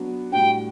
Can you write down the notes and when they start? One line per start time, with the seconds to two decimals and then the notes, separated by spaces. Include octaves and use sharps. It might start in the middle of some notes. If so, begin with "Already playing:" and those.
Already playing: F#3 B3 D4 F#4
0.31 A2 G3 D4 F#4 G5